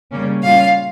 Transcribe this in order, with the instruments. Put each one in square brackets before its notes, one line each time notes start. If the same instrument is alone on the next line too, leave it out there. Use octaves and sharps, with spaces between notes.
[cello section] C#3 G3 A#3 C#4
[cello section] A#2 G3 C#4 F4 [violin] F5